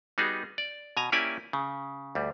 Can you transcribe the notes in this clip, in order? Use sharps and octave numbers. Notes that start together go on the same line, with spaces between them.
G3 B3 D#4 F#4 G#4
D5
B2 G#5 A#5
A#3 C#4 E4 G4 D5 G#5
C#3
D2 G3